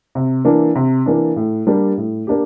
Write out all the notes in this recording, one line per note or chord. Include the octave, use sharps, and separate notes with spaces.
C3
E3 A#3 D4
C3
E3 A#3 D4
A2
G3 A#3 D4 G4
A2
A#3 D4 G4